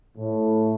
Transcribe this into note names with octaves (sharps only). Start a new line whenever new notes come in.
A2